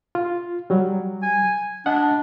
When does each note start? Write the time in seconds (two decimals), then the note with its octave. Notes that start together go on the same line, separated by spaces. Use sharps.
0.15 F4
0.70 F#3 G3
1.23 G#5
1.86 D4 D#5 F#5